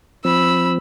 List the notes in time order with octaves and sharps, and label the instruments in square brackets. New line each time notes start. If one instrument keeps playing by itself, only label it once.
[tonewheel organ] F3 C4 [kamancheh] B5 E6